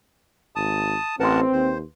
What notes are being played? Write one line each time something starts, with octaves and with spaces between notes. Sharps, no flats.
G#1 A5 D#6
A1 C4 A#4 B4 F#5 A5 C6
D#2 C5